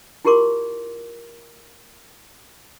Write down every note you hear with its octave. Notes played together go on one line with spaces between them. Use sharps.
E4 F4 G4 A#4 C6 D6